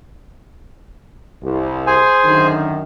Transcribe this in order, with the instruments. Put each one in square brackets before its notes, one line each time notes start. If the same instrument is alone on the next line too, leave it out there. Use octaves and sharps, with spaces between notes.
[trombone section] C2
[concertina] G#4 C5 G#5
[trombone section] F#2 D3 D#3